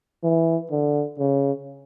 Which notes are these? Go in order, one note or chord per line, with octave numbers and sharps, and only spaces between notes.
E3
D3
C#3